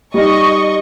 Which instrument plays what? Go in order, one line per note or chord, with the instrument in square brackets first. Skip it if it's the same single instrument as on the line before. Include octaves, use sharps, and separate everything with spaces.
[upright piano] G3 D#4 [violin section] D#5 C#6